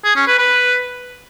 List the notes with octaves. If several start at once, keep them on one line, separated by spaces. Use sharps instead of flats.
G#4
C#4
B4
B4